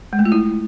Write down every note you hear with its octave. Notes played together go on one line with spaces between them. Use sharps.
G#3
A3
F4
E4